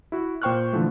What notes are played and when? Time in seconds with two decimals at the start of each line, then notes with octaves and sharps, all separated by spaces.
0.12 E4 F#4
0.42 A#2 C5 G5 C#6 F6 F#6
0.73 D3 E3 F3 A3